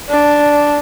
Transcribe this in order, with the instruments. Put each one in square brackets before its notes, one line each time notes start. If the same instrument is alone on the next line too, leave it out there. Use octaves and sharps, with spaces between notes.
[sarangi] D4